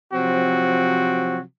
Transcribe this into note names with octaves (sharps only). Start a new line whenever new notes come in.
C3 F3 F#3 C4 F#4